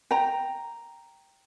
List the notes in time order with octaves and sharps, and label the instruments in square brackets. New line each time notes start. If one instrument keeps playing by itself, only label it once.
[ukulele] G5 A#5